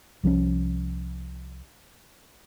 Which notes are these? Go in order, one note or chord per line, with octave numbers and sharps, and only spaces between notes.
C2 F3 F#3 C#4